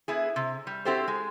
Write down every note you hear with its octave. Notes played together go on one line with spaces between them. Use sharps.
B3 E4 G#4
C3
G3
C4 E4 F#4 G4 A4 C5
G#3